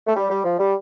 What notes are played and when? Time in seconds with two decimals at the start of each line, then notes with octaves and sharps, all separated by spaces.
0.07 A3
0.16 G3
0.30 G3
0.44 F3
0.59 G3